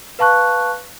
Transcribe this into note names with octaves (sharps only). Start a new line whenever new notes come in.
B4 F5 A5 C#6 F#6